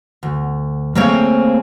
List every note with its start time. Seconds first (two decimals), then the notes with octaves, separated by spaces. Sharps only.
0.23 D2
0.95 A3 A#3 C4 G#4 C#5 F5